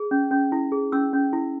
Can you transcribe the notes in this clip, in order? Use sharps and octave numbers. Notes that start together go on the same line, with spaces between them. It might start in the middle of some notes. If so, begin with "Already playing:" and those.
Already playing: G#4
C#4
C#4
E4
G#4
C#4 E6
C#4
E4